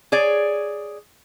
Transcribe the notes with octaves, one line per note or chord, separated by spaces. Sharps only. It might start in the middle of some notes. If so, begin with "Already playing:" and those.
G#4 C#5 D5